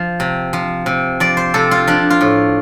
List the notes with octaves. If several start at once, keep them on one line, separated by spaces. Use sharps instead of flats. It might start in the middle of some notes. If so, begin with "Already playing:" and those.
Already playing: F3
C3
F3
C3
F3 D5
C5
C3 A4
F4
F3 D4
F4
A2